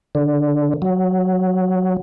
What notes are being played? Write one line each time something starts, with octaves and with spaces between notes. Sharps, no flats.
D3
F#3